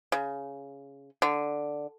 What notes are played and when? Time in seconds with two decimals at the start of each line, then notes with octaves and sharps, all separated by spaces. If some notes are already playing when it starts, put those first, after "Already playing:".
0.12 C#3
1.22 D3